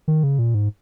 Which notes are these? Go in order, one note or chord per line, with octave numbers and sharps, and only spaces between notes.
D#3
C#3
A#2
G#2